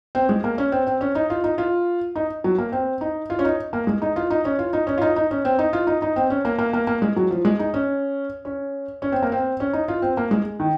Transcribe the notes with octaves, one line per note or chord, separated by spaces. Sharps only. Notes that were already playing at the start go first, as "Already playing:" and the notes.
C4
G#3
A#3
C#4
C4
C4
C#4
D#4
F4
D#4
F4
D#4
F#3
A#3
C4
D#4
F4
C#4
D#4
A#3
G#3
D#4
F4
D#4
C#4
F4
D#4
C#4
F4
D#4
D#4
C#4
C4
D#4
F4
D#4
D#4
C4
C#4
A#3
A#3
A#3
A#3
G#3
F#3
F3
G#3
D#4
C#4
C#4
C#4
C4
A#3
C4
C#4
D#4
F4
C4
A#3
G#3
D#3